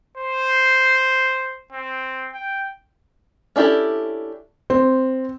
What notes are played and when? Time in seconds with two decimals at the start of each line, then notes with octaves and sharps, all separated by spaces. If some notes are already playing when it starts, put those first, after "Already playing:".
0.17 C5
1.72 C4
2.33 G5
3.56 C#4 D4 E4 G4 A4
4.70 C4